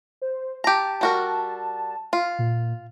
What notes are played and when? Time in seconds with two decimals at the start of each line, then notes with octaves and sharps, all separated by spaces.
0.22 C5
0.64 G4 A5 A#5
1.01 G3 F#4 A#4
2.13 F4
2.39 A#2